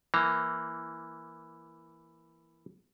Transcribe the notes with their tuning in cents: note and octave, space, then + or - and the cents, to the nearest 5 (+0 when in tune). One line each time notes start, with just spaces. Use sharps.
E3 +5 A#3 +0 A#5 -25